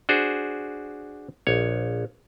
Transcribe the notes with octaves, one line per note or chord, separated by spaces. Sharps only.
D4 F#4 G#4 C5
A#1 C#5